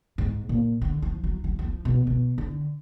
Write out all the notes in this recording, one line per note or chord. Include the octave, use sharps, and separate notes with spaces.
G#2
A#2
D3
F3
F#3
F#3
F#3
F3
B2
B2
D3